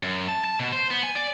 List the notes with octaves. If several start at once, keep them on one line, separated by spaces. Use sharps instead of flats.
F#2
A5
A5
B2
C5
B3
G#5
D5